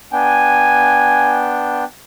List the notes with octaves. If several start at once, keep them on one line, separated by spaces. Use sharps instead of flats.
B3 D4 G5 G#5